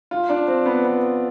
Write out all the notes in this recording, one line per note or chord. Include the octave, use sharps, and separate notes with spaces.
F4
D4
C4
B3
B3